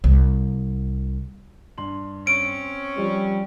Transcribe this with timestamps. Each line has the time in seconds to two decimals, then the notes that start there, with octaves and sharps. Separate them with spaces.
0.04 C2
1.78 G2 C6 F#7
2.27 C4 C#4 D7
2.98 F3 G3